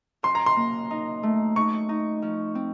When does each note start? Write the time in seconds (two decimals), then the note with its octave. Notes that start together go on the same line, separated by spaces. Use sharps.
0.23 F#2 C6
0.35 A#5
0.46 C6
0.56 A#3
0.91 D#4
1.23 A3
1.56 D#4 C#6
1.89 D#4
2.22 F3
2.55 C4